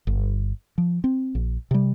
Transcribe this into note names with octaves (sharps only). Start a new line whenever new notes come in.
G1
F3
C4
A#1
C3 G3